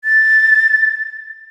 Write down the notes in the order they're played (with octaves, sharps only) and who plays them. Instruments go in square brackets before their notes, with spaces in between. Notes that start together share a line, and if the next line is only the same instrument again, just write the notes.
[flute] A6